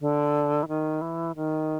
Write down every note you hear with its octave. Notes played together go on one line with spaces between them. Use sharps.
D3
E3
D#3
E3
D#3